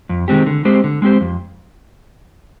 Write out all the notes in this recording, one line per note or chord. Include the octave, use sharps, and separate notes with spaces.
F2
D#3 G#3 C4 G4
D3
G#3 C4 G4 C5
D3
G#3 C4 G4 C5
F2